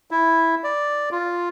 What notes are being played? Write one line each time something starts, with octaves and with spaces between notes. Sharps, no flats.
E4
D5
F4